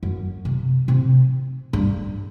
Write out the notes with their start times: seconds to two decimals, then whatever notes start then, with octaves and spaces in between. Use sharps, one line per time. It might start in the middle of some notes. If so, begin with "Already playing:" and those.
0.03 F#2
0.45 C3
0.88 C3
1.73 G2